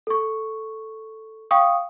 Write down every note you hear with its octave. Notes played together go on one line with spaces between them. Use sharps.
A4 C#6
F5 G5 C#6 D#6